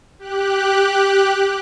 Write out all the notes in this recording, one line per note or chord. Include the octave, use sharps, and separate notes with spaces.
G4 F#6